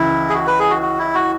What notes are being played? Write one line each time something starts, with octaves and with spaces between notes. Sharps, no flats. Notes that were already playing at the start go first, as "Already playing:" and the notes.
Already playing: C#2 E3 E4
G#4
F#4
B4
G#4
F#4
F#4
E4
F#4